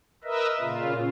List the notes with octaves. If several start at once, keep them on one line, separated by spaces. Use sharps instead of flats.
A#4 B4 D#5 E5
A#2 C#3 F4